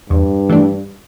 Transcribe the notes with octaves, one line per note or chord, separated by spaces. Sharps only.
E2 G2
E3 A3 D4